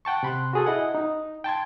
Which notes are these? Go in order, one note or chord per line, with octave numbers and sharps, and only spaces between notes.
F#5 G5 A5 C#6
C3 B5 C6 F#6
F#4 G#4 A4
E4 D#5 F#5
D#4
G5 A5 C6 G#6